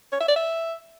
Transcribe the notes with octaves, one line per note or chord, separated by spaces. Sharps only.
C#5
E5
D5
E5